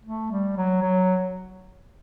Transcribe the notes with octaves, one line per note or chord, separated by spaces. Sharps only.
A3
G3
F#3
F#3